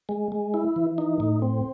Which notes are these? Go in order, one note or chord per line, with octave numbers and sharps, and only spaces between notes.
G#3
G#3
E4
E3
D#4
A2
C4